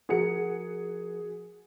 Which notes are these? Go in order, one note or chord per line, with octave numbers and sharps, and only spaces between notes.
F3 F#4 G#4 A#4 F#5 C#7